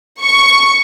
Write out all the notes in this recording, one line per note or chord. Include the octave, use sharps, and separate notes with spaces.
C#6